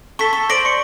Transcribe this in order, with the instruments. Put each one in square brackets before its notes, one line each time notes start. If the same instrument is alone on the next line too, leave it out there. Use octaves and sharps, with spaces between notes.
[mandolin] A4 [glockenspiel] C#6 B6 G7
[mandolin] A4
[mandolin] C5 D5 [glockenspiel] A#6 D7 F#7
[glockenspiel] C#6 C#7